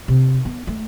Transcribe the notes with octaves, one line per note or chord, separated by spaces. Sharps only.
C3
B3
A3